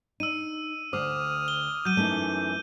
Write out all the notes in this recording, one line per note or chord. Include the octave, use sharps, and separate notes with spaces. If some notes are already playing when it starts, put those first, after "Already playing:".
D#4 E6 D#7
D2 C5 D6 D#6 F6
G7
F#3 G6 D#7
F#2 E3 A3 D#4 D#7